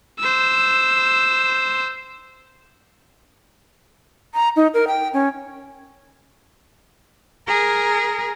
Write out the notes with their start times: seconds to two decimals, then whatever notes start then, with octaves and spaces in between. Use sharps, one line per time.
0.19 C5 E6
4.34 A#5
4.56 D#4
4.74 A#4
4.87 G5
5.14 C#4
7.48 G#4 A#4